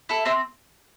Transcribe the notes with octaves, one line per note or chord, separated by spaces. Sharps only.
E4 A4
C4 C5 E5